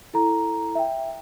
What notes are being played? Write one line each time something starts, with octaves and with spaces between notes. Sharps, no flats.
E4 A4 A#5
E5 G5